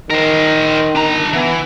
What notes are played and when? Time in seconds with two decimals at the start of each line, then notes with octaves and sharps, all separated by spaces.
0.11 D#3 A#4 C5
0.96 D4 A#5
1.34 E3 B3